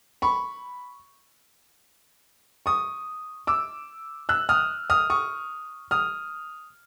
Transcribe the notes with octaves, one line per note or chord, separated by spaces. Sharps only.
B5 C#6
C#6 D#6
D6 E6
E6 F#6
D#6 F6
D#6 F6
C#6 D#6
D#6 F6